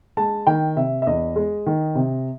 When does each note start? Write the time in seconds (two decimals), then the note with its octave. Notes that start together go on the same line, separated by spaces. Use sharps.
0.17 G#3 A5
0.47 D#3 G5
0.76 C3 E5
1.02 E5
1.07 E2 D#5
1.36 G#3
1.66 D#3
1.95 C3